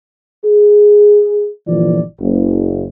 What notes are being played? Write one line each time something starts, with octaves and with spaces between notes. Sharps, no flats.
G#4
G1 A#2 E3 F3 D5
F#1